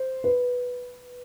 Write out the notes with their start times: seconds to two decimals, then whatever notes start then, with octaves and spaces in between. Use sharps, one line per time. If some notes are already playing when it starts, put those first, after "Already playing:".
Already playing: C5
0.24 B4